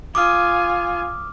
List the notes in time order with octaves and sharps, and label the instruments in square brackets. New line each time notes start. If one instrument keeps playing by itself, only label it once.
[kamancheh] F4 G#5 [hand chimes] D6 D#6 F6